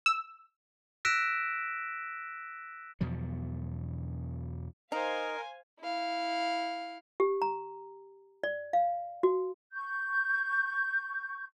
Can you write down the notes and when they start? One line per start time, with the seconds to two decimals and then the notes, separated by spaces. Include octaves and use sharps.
0.06 E6
1.05 E6 F#6 A#6 B6 D7 E7
3.01 E2 B2 F3 F#3
4.92 D#4 A#4 C5 F5 G#5
5.81 E4 F5
7.20 G4
7.42 A#5
8.44 D5
8.73 F5
9.23 F#4
9.73 C#6 G6